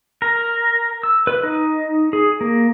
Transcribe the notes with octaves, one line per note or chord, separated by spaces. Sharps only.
A#4
E6
B4
D#4
G#4
A#3